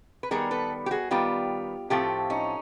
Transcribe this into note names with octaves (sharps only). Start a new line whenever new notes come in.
B4
D#3 G3 B3 G#4 A#4
A4 B4
G4
F#4 G#4
D#3 G3 B3 F4 G4
A2 F3 A3 C4 F4 G4
C#4 D#4